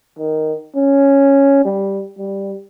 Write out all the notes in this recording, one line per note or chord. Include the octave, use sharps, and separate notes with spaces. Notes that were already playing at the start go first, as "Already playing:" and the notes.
D#3
C#4
G3
G3